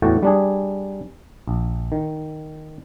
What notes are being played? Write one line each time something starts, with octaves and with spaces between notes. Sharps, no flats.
E2 A2 A3 F#4 G5 A5
G3 D4 G#4
A#1
D#3